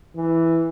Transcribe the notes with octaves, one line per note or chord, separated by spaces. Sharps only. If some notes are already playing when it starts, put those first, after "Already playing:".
E3